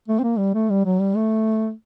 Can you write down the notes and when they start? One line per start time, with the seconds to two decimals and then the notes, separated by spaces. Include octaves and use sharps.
0.08 A3
0.19 C4
0.23 A#3
0.38 G3
0.54 A3
0.70 G3
0.85 F#3
1.00 G3
1.16 A3